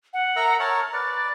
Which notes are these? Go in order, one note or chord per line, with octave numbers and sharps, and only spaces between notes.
F#5
A#4 E5 A#5
A#4 C#5 A5 F6
B4 D5 A6